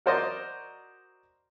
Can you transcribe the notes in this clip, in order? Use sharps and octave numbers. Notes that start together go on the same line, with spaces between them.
F#4 A#4 C5 D5 D#5